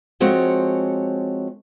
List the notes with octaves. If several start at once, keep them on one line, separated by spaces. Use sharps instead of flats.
F3 G#3 C4 F#4 A4 C#5